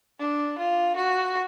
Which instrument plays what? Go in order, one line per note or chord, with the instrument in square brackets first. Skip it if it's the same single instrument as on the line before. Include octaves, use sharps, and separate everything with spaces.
[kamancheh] D4
F4
F#4